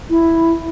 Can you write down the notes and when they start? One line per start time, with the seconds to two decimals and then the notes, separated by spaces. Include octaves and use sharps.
0.09 E4